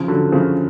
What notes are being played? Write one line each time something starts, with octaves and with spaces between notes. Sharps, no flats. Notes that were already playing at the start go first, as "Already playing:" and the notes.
Already playing: C#3 F3
D3 F#3
C#3 F3